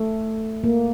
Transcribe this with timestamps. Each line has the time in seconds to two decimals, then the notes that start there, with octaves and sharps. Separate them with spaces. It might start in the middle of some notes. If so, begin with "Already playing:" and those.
Already playing: A3
0.64 A#3